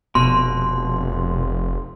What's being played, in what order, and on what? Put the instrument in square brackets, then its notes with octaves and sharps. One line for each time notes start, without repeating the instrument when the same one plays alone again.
[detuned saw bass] F1 [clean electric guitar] B2 [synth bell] C6